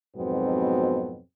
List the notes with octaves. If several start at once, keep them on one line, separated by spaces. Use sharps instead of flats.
F2 G#2 B2 F#3 B3 C4